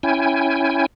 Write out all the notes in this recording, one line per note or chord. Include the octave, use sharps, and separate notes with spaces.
C#4 E4 G5 G#5